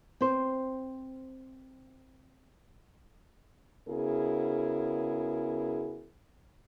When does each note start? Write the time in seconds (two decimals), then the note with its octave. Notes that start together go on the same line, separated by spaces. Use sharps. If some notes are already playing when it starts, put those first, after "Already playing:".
0.21 C4 C5
3.88 C#3 B3 E4 F#4 G#4 A#4